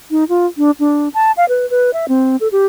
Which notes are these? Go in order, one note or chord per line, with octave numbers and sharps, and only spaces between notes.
D#4
F4
D4
D4
A5
F5
B4
B4
E5
C4
A4
G4